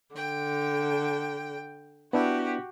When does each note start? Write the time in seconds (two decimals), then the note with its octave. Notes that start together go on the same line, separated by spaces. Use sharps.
0.15 D3 G5
2.13 B3 D4 E4 F#4 G4